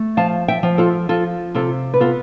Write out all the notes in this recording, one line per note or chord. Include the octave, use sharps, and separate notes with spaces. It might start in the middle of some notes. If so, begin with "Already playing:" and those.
Already playing: A3
F3 F5 A5
E5 G5
F3
F4 A4
F3 F4 A4
C3 F4 A4
B4
B3 F4 A4